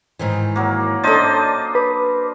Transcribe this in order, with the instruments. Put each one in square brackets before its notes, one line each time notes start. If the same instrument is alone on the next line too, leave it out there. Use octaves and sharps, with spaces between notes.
[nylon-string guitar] G#2 D#3 E3
[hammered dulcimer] F#3 A#3
[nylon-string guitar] C#4 A4 [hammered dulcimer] D4 C5 D#5 [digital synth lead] A6
[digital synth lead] B4